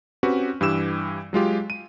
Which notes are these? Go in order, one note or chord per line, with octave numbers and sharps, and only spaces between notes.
C4 C#4 F#4 G4 B4
G2 E3 G4 E6 E7
F#3 G#3 F4 G4
D#7